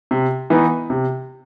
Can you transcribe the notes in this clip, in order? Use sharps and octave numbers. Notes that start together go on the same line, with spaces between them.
C3
E3 B3 D#4
C3